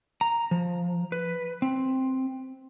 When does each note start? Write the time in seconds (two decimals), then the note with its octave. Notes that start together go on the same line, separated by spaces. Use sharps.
0.21 A#5
0.51 F3
1.12 B4
1.62 C4